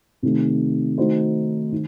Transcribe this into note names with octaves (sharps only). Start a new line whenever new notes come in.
C3 D#3 A3
D#3 A3 D#4 F#4 C5
D#3